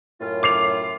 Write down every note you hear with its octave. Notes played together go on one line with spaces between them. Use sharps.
F#2 A2 F4
D6 C7 F7